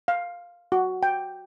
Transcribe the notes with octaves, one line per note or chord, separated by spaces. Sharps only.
F5
F#4
G5